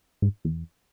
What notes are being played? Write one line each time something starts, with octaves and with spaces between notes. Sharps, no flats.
G#2
E2